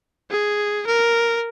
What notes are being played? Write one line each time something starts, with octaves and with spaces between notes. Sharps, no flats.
G#4
A#4